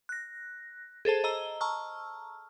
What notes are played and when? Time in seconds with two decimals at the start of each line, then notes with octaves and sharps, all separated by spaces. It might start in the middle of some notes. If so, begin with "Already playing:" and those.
0.09 F#6 A#6
1.05 G#4 A4 C5 A5
1.24 D#5 A#5 E6 G7
1.61 A5 A#5 C#6 E6 F6